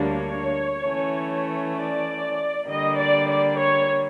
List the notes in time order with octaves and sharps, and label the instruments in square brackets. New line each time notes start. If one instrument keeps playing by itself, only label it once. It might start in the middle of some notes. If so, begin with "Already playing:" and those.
Already playing: [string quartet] D2 D3 G3 A#3 D4 [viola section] C#5
[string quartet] E3 A3 C#4
[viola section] D5
[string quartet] D3 G3 A#3 [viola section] D#5
[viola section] D5
D5
C#5